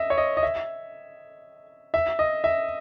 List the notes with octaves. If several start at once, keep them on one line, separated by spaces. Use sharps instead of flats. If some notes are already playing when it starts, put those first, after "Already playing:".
Already playing: D#5 E5
C#5
D#5
D#5
E5
E5
D#5
E5